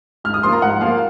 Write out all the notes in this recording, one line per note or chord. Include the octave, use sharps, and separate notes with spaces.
G#2 F6
D#6
F3 A#3 F4 C6
A#5
G#2 F#5
F3 A#3 F4 F5